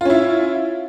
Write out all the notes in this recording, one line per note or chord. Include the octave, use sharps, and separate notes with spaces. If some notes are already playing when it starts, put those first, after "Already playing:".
C#4 E4 F4